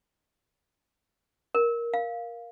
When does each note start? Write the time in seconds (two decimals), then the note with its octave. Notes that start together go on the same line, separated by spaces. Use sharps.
1.55 A#4
1.94 F5